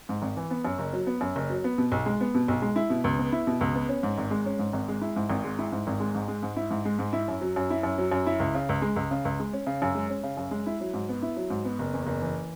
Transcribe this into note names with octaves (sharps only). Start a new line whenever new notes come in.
G#2
G#1
E3
B3
F#2
F#1
F#3
B3
F#2
F#1
F#3
B3
B2
B1
G#3
B3
B2
B1
G#3
E4
B2
C#2
B3
E4
B2
C#2
B3
C#4
G#2
G#1
G#3
C#4
G#2
G#1
G#3
E4
G#2
G#1
G#3
E4
G#2
G#1
G#3
G#2
G#3
G#2
E4
G#2
G#3
G#2
E4
F#2
F#3
F#2
E4
F#2
F#3
F#2
E4
C#2
C#3
C#2
G#3
C#2
C#3
C#2
G#3
C#4
C#3
F#2
G#3
C#4
C#3
F#2
G#3
E4
F#3
G#2
B3
E4
F#3
G#2
B3
F#1
E2
F#1
E3